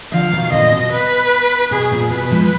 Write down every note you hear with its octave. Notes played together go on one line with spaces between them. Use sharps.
D3 F3 F5
B2 D#3
A#2 D3 D#5
B2
B4
B2 G#4
A#2
B2 B4
F3 G#3